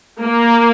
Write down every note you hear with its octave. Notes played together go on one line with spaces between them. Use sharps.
A#3